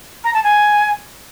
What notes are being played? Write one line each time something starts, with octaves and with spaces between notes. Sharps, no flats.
A#5
A5
G#5